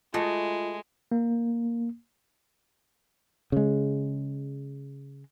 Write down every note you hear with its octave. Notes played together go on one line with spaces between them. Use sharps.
G#3 A3 F4 F#4 G#4 D#5
A#3
C#3 G#3